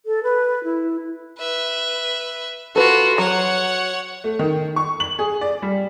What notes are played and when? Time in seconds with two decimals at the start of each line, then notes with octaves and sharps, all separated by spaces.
0.06 A4
0.23 B4
0.64 E4
1.38 B4 E5
2.76 F4 F#4 A4 B4
3.18 F#3 C#5 F#5
4.24 A3
4.39 D#3
4.76 C#6
5.00 F#7
5.19 G#4
5.41 D5
5.62 G3